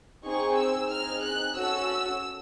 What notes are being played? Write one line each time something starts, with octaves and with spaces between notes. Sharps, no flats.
C4 D#4 G#4 C#6
E6
C4 D#4 G#4 F6
F#6
C#4 F#4 A4 E6